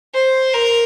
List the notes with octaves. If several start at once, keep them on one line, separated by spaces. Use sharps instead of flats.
C5
A#4